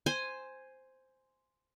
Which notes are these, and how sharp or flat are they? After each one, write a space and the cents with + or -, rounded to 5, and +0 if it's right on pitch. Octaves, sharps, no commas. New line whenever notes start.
C5 +0 G#5 +0